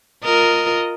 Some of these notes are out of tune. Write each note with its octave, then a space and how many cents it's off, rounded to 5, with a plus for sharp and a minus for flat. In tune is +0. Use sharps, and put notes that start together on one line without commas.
F4 +5 A#4 -5 D#5 +0